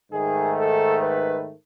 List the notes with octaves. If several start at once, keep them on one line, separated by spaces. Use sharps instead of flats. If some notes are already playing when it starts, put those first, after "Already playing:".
G#2 D#3 A3 G#4
A4
B4